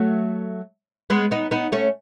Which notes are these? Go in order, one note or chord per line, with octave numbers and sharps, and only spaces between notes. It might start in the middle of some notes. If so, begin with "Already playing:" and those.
Already playing: F#3 A3
G#3 B3
B3 D#4
B3 D#4
A3 C#4